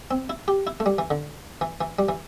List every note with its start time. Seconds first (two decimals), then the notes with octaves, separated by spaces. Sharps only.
0.11 C4
0.30 E4
0.48 G4
0.67 E4
0.80 A3
0.86 G3
0.98 E3
1.11 D3
1.61 E3
1.81 E3
1.99 G3
2.09 E3